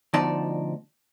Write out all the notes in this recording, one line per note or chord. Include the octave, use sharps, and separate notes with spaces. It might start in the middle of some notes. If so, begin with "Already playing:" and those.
D2 B2 F3 D#4 D5 A5